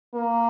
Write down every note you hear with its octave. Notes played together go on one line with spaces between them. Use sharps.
A#3